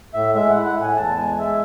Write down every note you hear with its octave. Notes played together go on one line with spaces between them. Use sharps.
A2 E5
G#3 E5
E4 F#5
F#5
A2
G#5
E2 A5
G#3 G#5
G#3 E5